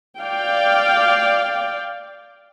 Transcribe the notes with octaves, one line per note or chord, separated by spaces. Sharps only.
D5 F5 G5